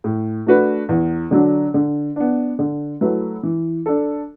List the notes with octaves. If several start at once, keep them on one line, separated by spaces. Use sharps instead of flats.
A2
A3 D4 F#4 B4
E2
D3 F#3 D4
D3
B3 D4
D3
F#3 A3 E4 B4
E3
D4 A4